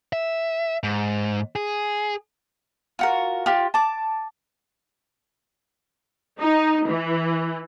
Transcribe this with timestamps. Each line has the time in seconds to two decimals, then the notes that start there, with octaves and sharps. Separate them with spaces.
0.13 E5
0.84 G#2
1.56 G#4
2.99 F4 F#4 A#4
3.46 F4 G4
3.74 A5 D6
6.39 D#4
6.86 E3